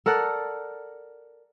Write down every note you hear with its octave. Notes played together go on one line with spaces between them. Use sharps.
A4 A#4 D5 F#5